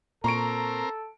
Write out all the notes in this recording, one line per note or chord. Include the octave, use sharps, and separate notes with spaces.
A#2 C4 A4 A#4 A#5 C#6 D7